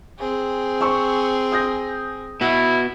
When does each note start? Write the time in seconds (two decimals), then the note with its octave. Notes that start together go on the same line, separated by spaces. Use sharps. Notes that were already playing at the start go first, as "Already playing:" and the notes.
0.19 C4 G#4
0.81 C5 C#6 E6
1.52 D#6 G6 A#6
2.41 B3 E4 F#4